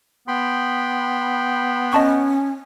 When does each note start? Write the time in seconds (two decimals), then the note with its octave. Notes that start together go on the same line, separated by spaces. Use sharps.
0.28 B3 G5 B5 C6
1.93 C#4 D#5 A5 C#6